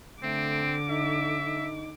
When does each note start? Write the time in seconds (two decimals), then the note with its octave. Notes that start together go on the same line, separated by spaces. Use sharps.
0.23 D3 A3 C4 D6
0.89 D#4 E5
1.46 D#4